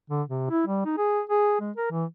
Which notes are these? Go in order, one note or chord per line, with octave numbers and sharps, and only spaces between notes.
D3
C3
E4
G3
D#4
G#4
G#4
G#3
A#4
E3